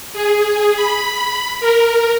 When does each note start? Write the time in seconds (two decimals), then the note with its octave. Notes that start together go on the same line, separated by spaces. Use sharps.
0.13 G#4
0.75 B5
1.60 A#4